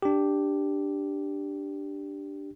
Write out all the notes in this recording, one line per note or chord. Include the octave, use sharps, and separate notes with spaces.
D4 G4